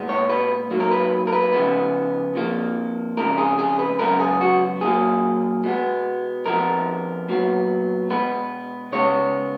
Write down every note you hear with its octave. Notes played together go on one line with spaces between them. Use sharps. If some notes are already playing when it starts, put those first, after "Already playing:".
Already playing: A#2 G#3 B3
C#5
B4
G#2 F#3 A#3
A#4
B4
A#4
B4
C#3 F3 G#3 B3
F2 F3 A#3
F2 C#3 G#3 A#4
G#4
G#4
B4
F#2 C#3 G#3 B3 A#4
G#4
F#4
A#2 F#3 A#3 G#4
B2 G#3 B3
F2 F3 B3 A#4
A#2 F#3 B3
B2 G#3 B3 B4
C#3 G#3 B3 C#5